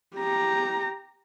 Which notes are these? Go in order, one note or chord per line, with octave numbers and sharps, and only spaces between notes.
G4 A#5